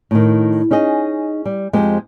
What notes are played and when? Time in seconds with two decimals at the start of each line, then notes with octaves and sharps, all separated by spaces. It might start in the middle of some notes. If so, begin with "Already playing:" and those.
0.11 A2 D#3
0.71 C#4 D#4 G#4 D#5
1.46 G3
1.73 F2 G#3 G4 C5